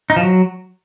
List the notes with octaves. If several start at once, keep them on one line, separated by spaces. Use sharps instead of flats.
D#4
F3
F#3